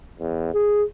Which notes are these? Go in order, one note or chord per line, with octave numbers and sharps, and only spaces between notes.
E2
G#4